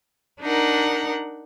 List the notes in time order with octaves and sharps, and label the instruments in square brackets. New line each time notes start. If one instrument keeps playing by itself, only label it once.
[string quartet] D4 D#4 A#4 F#5